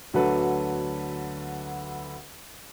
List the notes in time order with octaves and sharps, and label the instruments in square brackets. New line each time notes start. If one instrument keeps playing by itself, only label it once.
[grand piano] D2 D3 F#3 A4 B4